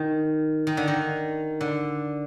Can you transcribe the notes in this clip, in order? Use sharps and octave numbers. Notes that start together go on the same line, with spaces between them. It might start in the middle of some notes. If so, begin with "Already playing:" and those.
Already playing: D#3
D#3
D3
D#3
D3